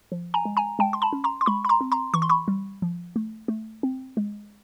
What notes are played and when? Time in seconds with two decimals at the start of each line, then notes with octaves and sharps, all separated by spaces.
0.12 F3
0.34 G#5 A#5
0.45 G#3
0.57 G#5 A#5
0.79 G#3 G5 A5
0.93 C6
1.02 A5 B5
1.13 C#4
1.24 A#5 C6
1.41 C6
1.46 G#3 B5 C#6
1.65 B5
1.69 A#5 C6
1.81 C4
1.92 A#5 C6
2.14 E3 C#6
2.22 C6
2.29 B5 C#6
2.48 G3
2.82 F3
3.16 A3
3.48 A3
3.83 C4
4.17 G#3